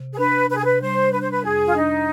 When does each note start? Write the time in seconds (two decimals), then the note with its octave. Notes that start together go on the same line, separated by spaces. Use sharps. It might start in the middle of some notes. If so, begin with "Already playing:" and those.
Already playing: C3
0.13 G#4
0.18 D4 B4
0.50 C3 B4
0.57 G#4
0.65 B4
0.81 G3 C5
1.13 D4 B4
1.22 C5
1.31 B4
1.44 F2 G#4
1.66 F4
1.75 D4 D#4